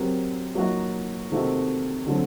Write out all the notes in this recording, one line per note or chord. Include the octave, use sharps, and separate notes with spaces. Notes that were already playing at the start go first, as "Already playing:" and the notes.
Already playing: F#3 C4 G4 A#4
F#3 A#3 D#4 F#4
C3 D#3 A3 C4 F#4
D3 F#3 A3 C4